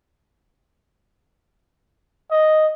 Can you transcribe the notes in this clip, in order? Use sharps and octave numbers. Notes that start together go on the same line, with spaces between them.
D#5